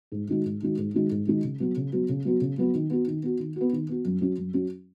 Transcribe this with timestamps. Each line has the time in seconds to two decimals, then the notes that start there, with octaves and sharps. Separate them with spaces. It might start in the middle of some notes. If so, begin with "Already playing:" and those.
0.12 G#2
0.28 D#3 G#3 D#4 F#4
0.45 G#2
0.62 D#3 G#3 D#4 F#4
0.78 G#2
0.94 D#3 G#3 D#4 F#4
1.11 G#2
1.26 D#3 G#3 D#4 F#4
1.44 C#3
1.60 F#3 B3 F#4
1.76 C#3
1.92 F#3 B3 F#4
2.09 C#3
2.25 F#3 B3 F#4
2.41 C#3
2.58 F#3 B3 F#4
2.74 D#3
2.90 B3 F#4
3.07 D#3
3.23 B3 F#4
3.39 D#3
3.56 B3 F#4
3.72 D#3
3.89 B3 F#4
4.05 F#2
4.21 F#3 C#4 F#4
4.38 F#2
4.54 F#3 C#4 F#4